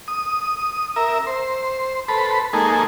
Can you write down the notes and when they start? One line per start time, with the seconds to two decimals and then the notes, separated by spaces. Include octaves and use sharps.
0.08 D#6
0.96 A#4 E5
1.27 C5
2.08 A4 B4 C5 B5
2.53 G#3 A#3 D#4 G#4 A4